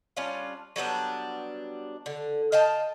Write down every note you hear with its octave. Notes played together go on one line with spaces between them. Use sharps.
G3 C#4 D4 F4
F#3 G3 B3 D4
D3
D#5 F5 G5 A5